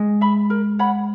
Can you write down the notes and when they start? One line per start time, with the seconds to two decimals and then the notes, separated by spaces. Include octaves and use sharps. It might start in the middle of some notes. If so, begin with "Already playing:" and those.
Already playing: G#3
0.21 E5 B5
0.50 A#4
0.79 C#5 F#5 B5